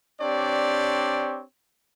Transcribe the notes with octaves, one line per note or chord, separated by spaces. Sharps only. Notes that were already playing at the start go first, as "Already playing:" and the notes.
C4 D4 G4 C#5 D5